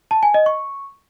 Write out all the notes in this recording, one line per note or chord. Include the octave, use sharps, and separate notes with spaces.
A5
G#5
D#5
C#6